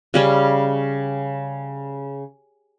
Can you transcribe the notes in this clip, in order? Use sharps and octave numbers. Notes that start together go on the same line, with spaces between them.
C#3 G3 C#4